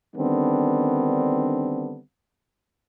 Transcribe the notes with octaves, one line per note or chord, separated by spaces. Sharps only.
D3 D#3 G3 B3 C4 D4